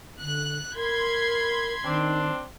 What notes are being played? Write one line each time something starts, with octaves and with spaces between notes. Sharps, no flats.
D3 F#6
A#4 B5 C6 G#6
D#3 C4 D4